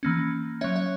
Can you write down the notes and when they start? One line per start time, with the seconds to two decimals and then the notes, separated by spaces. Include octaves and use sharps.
0.03 E3 A#3 C#4
0.61 F#3 C#4 C#5 E5
0.76 C#5 E5